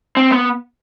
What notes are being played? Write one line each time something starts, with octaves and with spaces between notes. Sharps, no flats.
C4
B3